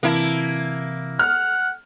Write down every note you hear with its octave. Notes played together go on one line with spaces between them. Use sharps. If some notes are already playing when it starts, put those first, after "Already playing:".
C3 E3 A#3 E4 A5
F#5 F6